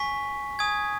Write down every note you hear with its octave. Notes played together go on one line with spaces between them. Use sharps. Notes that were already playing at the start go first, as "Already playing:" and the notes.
Already playing: G#5 C#6 B6
G#5 D#6 G#6